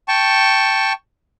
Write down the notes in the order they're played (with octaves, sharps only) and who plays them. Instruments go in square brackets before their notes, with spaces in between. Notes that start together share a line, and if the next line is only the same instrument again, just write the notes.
[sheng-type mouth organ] G5 A5 C#6